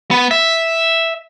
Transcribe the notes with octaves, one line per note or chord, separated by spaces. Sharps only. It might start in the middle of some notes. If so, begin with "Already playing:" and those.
B3
E5